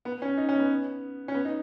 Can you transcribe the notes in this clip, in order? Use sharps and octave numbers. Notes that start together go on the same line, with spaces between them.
B3
C#4
D#4
C#4
B3
C#4
B3
D#4